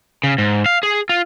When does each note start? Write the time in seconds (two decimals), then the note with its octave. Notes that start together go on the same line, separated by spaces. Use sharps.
0.23 C#3
0.38 G#2
0.66 F5
0.83 G#4
1.09 F4